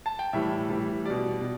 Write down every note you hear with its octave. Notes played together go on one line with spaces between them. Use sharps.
A5
G5
A2 E3 G3 E5
A2 E3 G3
B2 G3 D5
B2